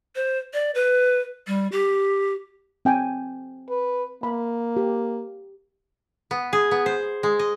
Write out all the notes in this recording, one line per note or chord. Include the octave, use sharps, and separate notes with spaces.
C5
D5
B4
G3
G4
C4 G5 G#5
B4
A#3 B5
G4
B3
G#4
B3
C5
G#3
D#5